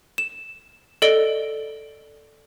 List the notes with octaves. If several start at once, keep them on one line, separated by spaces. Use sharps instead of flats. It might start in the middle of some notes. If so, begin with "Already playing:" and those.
E7
A4 D5 D#5 D7 G7